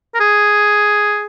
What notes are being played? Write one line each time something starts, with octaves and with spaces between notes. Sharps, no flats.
A#4
G#4